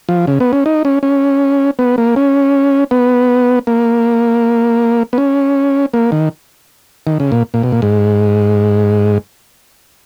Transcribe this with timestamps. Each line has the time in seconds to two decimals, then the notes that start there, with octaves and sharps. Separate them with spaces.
0.09 F3
0.27 C#3
0.40 B3
0.53 C#4
0.66 D#4
0.85 C#4
1.03 C#4
1.79 B3
1.98 A#3
2.16 C#4
2.91 B3
3.67 A#3
5.13 B3
5.18 C#4
5.94 A#3
6.12 D#3
7.07 D#3
7.20 C#3
7.32 A#2
7.54 A#2
7.63 B2
7.72 A#2
7.82 G#2